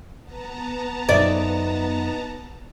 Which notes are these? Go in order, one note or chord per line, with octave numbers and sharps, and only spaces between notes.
B3 A5 A#5
F#2 D#4 F4 D5 E5